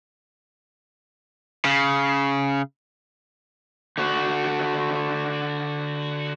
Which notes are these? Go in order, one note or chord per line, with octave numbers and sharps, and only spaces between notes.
C#3
D3 F#4